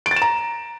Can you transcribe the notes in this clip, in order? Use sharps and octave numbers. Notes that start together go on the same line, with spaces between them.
D7
A6
E7
A#5